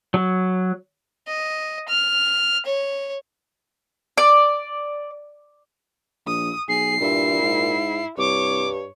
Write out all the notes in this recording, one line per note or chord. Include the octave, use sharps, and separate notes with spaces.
F#3
D#5
F6
C#5
D5
A#1 D#6
B1 G#4 C7
G2 A#2 E4
G#2
C2 G2 C#5 D6